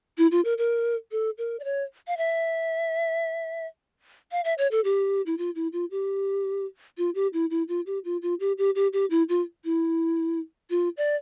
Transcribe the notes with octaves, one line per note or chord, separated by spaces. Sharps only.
E4
F4
A#4
A#4
A4
A#4
D5
C#5
F5
E5
F5
E5
C#5
A4
G4
E4
F4
E4
F4
G4
F4
G4
E4
E4
F4
G4
F4
F4
G4
G4
G4
G4
E4
F4
E4
F4
D5